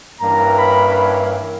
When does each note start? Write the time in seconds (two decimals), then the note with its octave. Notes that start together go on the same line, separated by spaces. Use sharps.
0.20 G2 E3 A#3 C#4 A#5
0.58 B5